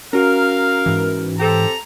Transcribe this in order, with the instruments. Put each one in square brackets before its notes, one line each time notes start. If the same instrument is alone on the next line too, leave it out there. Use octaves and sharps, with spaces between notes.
[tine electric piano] C#4 F#4 [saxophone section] A#4 [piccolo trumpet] F5 [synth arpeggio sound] A#5
[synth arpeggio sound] G#2 E3
[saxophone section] C4 G4 A4 [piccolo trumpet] A#5